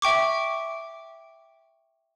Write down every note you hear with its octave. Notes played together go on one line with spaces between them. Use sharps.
E5 G5 C#6 D6